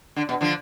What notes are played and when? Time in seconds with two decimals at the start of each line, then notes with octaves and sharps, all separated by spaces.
0.16 D3
0.29 B2
0.41 D3 F3